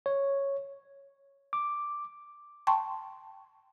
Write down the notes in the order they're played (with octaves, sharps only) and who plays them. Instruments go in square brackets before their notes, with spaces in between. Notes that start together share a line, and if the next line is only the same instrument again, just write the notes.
[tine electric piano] C#5
D6
[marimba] G5 A5 C6 C#6